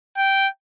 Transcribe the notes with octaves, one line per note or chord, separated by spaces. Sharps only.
G5